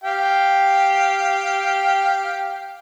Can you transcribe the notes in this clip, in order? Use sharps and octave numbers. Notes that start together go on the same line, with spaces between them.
G4 F5 G5